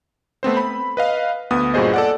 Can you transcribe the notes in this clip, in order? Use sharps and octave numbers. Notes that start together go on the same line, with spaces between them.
A3 B3 C4 C5
B5
B4 D#5 F5
D2 B3 D#6
G2 A#2 F#4 G#4 C5 D#5
A4 D5 F#5